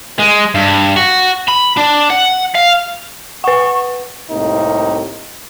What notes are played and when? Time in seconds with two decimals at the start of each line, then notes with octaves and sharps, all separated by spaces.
0.19 G#3
0.55 G2
0.96 F#4
1.48 B5
1.77 D4
2.10 F#5
2.55 F5
3.44 B4 F#5 C#6
4.31 C2 A2 C3 A#3 D#4